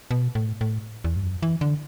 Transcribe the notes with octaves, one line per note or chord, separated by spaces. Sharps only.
B2
A2
A2
E2
G2
F#2
E3
D3